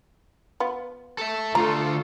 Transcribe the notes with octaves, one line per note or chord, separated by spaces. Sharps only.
B3 F4
A4 E5
D2 A3 F4 A4 A#5